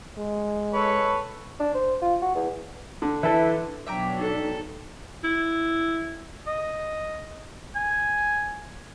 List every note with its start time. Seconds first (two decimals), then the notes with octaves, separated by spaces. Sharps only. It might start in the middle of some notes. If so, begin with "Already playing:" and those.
0.18 G#3
0.74 A4 B4 C#5
1.60 D4
1.75 C5
2.02 F4
2.22 F#4
2.35 E2
3.02 D3
3.23 E3 E4 A4 B4
3.87 B2 F#3 D4 E5 G5 A#5 D6
4.19 D#4 A4
5.24 E4
6.47 D#5
7.75 G#5